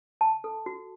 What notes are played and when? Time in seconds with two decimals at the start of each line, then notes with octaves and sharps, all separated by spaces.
0.21 A5
0.44 A4
0.66 F#4